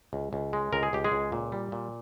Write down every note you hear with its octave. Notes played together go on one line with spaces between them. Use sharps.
C#2
C#2
G#3
C#2 A#4
G#4
C#2 G4
G#3 G#4
C#2
A#2
G3
A#2